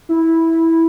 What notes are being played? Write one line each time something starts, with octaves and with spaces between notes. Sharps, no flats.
E4